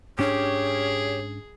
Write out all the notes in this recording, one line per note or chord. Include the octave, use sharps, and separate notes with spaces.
G#2 C#4 D4 G4 G#4 C#5